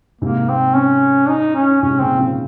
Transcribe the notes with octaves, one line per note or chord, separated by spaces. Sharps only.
G#2 C3 A#3
C4
C#4
D#4
C#4
G#2 C3 C#4
A#2 C#3 C4
C#3 F3